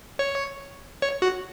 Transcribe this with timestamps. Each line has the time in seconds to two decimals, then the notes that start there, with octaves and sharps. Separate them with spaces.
0.19 C#5
1.02 C#5
1.22 F#4